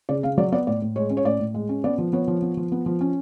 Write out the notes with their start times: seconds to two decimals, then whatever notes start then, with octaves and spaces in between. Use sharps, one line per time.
0.09 C#3 D5
0.23 C#3 F5
0.37 F#3 D5
0.52 B3 D5
0.67 A2 D5
0.82 A2
0.96 G#3 C#5
1.10 C#4
1.17 C#5
1.25 A2 D5
1.40 A2
1.54 G#3
1.69 C#4
1.84 B3 D5
1.98 F3
2.13 B3 C#5
2.28 F3
2.42 B3
2.57 F3
2.72 B3
2.86 F3
3.01 C#4